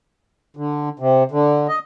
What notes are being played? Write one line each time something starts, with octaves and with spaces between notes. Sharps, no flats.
D3
C3
D3
D#5